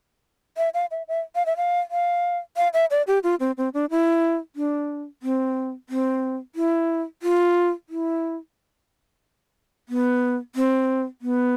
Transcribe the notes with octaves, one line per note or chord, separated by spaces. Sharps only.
E5
F5
E5
E5
F5
E5
F5
F5
F5
E5
D5
G4
F4
C4
C4
D4
E4
D4
C4
C4
E4
F4
E4
B3
C4
B3